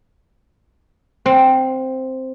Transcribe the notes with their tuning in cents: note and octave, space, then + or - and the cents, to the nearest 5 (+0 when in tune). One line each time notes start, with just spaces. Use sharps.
C4 +0 F5 +45